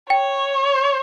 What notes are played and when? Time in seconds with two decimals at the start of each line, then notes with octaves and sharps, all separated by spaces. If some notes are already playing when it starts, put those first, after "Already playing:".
0.10 C#5 G5